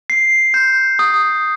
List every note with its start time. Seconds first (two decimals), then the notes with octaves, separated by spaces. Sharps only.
0.10 C7
0.54 G6
0.99 D#6